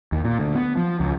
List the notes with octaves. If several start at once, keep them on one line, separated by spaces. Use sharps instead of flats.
D#2
A#2
D2
B3
F3
C#2